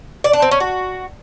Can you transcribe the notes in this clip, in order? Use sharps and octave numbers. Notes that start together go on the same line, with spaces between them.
D5
D4
C4
C#4
F#4